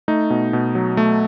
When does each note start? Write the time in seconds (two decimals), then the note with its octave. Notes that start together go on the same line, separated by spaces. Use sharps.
0.08 A3 D#4
0.30 B2
0.53 B2
0.75 F#3
0.97 A3